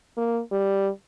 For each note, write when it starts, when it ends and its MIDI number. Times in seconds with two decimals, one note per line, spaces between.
0.17 0.40 58
0.52 0.89 55